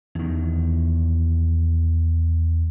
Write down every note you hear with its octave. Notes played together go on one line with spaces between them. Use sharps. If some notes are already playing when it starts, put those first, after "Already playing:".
E2 D#3